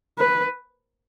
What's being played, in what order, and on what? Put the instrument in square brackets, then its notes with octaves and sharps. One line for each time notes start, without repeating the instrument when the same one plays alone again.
[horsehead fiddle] B4